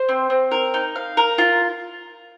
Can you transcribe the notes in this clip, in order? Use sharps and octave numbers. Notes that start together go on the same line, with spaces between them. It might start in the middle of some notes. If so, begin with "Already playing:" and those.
Already playing: C5
C4
C4
A#4
D#4
F5
A#4
F4